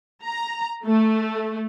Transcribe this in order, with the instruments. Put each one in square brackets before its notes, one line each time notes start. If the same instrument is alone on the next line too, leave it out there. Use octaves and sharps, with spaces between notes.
[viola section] A#5
A3